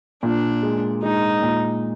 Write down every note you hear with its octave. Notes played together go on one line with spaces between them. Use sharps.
A#2 D4
G#3
G#3 D#4
A#2